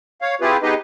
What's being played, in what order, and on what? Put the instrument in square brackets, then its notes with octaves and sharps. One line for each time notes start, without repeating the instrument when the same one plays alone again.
[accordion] C#5 F5
C4 E4 F4 G4 G#4 B4
B3 D#4 G4 G#4 B4 D#5